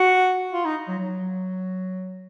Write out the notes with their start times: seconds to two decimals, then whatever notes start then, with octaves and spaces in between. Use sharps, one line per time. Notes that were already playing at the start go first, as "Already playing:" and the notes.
Already playing: F#4
0.53 F4
0.65 D#4
0.88 F#3
0.99 F#3